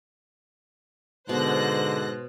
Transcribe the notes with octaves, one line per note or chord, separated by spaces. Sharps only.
G#2 B2 D3 C5 F#6 A#6